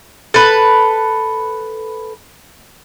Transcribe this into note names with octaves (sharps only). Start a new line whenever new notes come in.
A4 B4